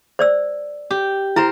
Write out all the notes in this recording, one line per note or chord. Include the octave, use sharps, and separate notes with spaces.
C5 D5 E6
G4
E4 A#4 C5 A#5